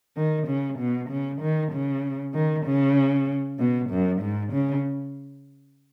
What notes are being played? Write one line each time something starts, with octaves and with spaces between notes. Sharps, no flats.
D#3
C#3
B2
C#3
D#3
C#3
D#3
C#3
B2
F#2
G#2
C#3